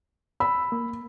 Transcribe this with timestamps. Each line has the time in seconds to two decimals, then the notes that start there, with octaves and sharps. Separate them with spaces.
0.40 B5 E6
0.72 A#3